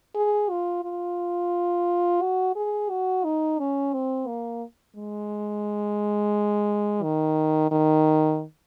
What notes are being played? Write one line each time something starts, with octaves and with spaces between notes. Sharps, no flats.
G#4
F4
F4
F#4
G#4
F#4
D#4
C#4
C4
A#3
G#3
D#3
D#3